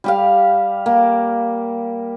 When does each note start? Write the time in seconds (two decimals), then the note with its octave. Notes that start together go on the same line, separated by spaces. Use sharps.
0.04 G3 G4 F5
0.86 A#3